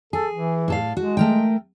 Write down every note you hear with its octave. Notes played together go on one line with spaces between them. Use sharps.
G#4 A4
E3
A2 A4 F5
G#3 F#4
A3 A#4 G5